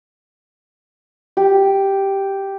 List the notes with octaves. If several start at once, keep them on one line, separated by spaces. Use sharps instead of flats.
G4